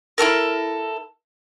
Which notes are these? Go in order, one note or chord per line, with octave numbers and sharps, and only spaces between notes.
E4 F#4 A4 A#4